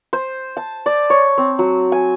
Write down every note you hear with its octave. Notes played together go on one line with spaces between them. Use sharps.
C5
A5
D5
C#5
C4
F#3
G#5